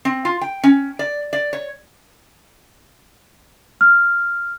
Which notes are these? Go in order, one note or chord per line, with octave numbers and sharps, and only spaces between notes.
C4
F4
G5
C#4
D5
D5
C#5
F6